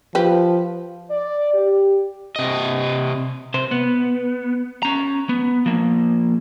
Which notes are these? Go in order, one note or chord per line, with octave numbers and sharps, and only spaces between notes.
F3 G4 B4
D5
G4
C3 D#5
C3 C5
B3
C#4 A#5
B3
F3 A#3